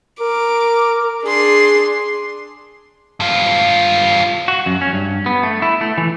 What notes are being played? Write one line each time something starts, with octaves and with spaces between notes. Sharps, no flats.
A#4 D6
D4 G#4 C6
G2 F4
F#4
F#2
C#4
G2
B3
A3
E4
A3
E3